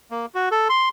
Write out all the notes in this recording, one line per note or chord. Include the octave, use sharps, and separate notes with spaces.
A#3
F#4
A4
C6